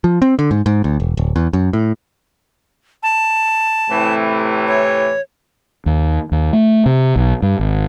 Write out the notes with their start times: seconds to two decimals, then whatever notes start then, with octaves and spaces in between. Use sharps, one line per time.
0.04 F3
0.22 C4
0.39 D3
0.51 G#2
0.66 G#2
0.84 D2
1.00 E1
1.17 D1
1.36 E2
1.53 F#2
1.73 A2
3.03 A5
3.90 A2 C3 E3
4.67 C#5
5.86 D#2
6.32 D#2
6.53 A3
6.86 C3
7.16 B1
7.42 G2
7.59 G#1